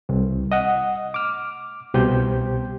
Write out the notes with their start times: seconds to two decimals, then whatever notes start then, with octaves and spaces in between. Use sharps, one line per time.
0.09 C2 C4
0.52 D#5 F#5
1.14 D6 F6
1.94 C2 B2 G4 C5 G6